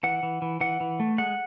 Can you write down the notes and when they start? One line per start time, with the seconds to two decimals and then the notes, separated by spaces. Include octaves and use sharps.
0.03 E3 F#5
0.23 E3
0.42 E3
0.61 E3 F#5
0.80 E3
1.00 A3
1.18 G#3 F#5